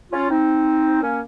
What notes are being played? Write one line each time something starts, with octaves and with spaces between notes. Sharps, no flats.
C#4 F4
C4 D#4
A#3 C#4